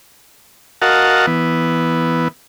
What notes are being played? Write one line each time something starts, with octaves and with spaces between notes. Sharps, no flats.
F#4 A#4 D#5 F5 F#5 A5
E3 B3